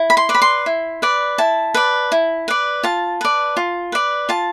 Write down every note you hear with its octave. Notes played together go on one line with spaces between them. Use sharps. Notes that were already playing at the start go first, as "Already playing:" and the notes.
Already playing: E4
B5
C6
B4 D5
B5
C6
E4
B4 D5
E4 A5
B4 D5
E4
B4 D5
F4 A5
B4 D5
F4
B4 D5
F4 A5